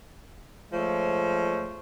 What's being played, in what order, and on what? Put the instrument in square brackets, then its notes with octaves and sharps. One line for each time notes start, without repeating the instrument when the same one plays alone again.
[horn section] F3 G#3 A3 C5 C#5